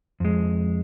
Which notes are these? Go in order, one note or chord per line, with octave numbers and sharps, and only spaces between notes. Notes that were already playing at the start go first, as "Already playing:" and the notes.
F2 G#3